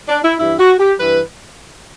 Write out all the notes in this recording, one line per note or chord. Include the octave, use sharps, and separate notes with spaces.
D4
E4
G2 E3 G3 E4
F#4
G4
G2 E3 G3 B4